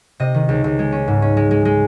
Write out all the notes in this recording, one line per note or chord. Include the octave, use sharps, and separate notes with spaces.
C3 D#5
D#3
C#2
C#2
G#3
C#4
G#2
C#4
G#3
G#3
G#3